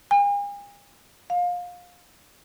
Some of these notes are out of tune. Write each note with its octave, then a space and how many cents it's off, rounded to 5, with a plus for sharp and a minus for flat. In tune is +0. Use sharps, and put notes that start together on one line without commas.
G#5 -45
F5 +25